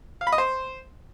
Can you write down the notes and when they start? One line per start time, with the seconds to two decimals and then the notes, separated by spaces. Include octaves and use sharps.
0.21 F5
0.27 B5
0.32 D#5
0.38 C5